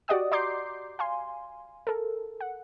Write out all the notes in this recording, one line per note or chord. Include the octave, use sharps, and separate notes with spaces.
F#4 G4 D5 D#5 F#5 D#6
D5 A#5 C6 D6 G6 C7
F5 G#5 C6
A4 A#4
F#5